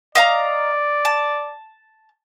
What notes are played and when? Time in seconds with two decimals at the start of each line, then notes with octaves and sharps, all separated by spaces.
0.15 D5 D#5 F5 A#5
1.05 A5